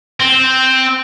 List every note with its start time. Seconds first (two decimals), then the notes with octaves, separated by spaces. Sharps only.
0.20 C4